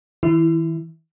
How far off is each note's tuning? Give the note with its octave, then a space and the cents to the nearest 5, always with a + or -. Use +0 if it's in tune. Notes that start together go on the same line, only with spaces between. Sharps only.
E3 -45 E4 +0